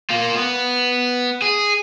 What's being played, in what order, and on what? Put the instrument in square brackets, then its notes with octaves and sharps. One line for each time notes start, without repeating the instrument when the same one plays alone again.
[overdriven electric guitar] A#3 F4
B3
G#4